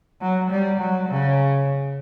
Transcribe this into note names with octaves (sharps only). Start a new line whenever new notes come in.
F#3
G3
F#3
C#3